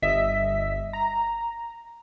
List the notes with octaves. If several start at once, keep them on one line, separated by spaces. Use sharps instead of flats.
G1 D#5 E5 B6
A#5